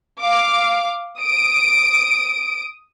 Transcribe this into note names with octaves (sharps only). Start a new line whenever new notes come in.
F5 D6
D#6 D7